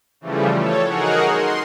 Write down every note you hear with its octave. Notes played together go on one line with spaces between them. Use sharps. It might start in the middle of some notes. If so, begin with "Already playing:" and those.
C#3 E3 F3 G3 A3
A4 C#5
D#4 F#4 G#4 A#4 F#5
C6